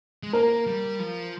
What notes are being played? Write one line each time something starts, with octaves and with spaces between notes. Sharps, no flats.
G#3
A#3 A#4
G3
F3